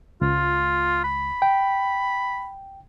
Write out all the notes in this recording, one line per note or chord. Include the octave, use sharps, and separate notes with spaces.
C#2 F4
B5
G5